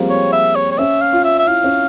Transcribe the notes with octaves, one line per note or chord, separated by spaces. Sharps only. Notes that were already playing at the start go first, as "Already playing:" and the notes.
Already playing: F3 G3 G#3 A#3 C4
C#5
E5
C#5
C#5
C#4 E5
F5
F4
E5
E5
E4 F5
C#4